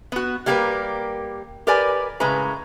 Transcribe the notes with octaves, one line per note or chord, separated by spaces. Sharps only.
B3 F#4
G3 A#3 G4 G#4 A#4 B4
G4 A#4 B4 D5 G#5
A2 C#3 G#3 C#4 B4 A#5